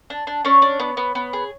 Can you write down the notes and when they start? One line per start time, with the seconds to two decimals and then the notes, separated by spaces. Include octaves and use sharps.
0.10 D4
0.27 D4
0.45 C#4 D4 C#5
0.62 D4
0.80 B3
0.97 B3
1.15 B3
1.33 G#4